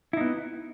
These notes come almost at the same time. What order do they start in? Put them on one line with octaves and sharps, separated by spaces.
E4 D#4 B3